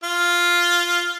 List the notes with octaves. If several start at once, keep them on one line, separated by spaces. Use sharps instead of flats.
F4